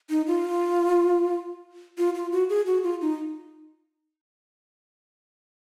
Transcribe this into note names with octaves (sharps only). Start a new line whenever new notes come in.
D#4
F4
F4
F4
F#4
G#4
F#4
F4
D#4